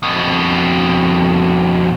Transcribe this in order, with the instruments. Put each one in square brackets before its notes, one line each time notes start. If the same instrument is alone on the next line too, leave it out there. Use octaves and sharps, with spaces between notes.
[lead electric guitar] F2 B2